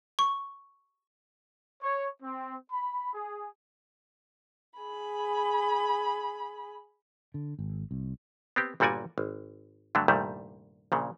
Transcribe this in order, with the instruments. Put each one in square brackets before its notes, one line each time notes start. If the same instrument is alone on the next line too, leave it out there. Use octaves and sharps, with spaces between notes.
[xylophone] C#6
[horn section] C#5
C4
B5
G#4
[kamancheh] G#4 B5
[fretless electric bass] D3
G#1
C2
[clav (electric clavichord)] B3 C4 G4
G1 A#2 G3 F#4 D5 G#5
G#1
G2 D3 F#3 A3
C2 G2 A#2 D#3 G3 A3
A#1 A#2 C#3